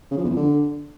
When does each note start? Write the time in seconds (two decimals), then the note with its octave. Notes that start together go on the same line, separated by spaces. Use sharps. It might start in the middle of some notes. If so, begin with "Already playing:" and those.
0.11 C#3
0.18 F3
0.24 E2
0.30 F2
0.37 D3